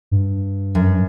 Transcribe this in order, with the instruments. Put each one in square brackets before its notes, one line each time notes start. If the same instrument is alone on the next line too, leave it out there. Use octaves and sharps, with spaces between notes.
[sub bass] G2
[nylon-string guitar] F#2